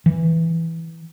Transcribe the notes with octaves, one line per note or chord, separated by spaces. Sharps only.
E3